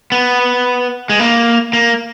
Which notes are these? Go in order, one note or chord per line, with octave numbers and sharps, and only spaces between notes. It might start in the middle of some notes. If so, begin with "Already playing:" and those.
B3
G#3
A#3
A#3